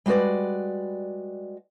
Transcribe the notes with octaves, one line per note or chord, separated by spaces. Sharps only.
G3 G#3 F#4 B4 D5